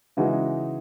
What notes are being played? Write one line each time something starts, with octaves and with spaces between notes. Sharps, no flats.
C#3 E3 G#3 D#4 F#4